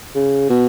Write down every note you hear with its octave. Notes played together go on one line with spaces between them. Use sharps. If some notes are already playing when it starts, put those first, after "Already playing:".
C#3
B2